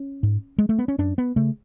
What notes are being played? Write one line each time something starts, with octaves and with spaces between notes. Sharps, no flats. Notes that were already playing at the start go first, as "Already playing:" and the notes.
Already playing: C#4
G#2
G#3
A3
B3
C#4
F#2 D4
B3
C#3 A3